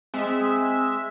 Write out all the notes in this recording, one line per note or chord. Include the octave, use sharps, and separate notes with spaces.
G#3 C4 E5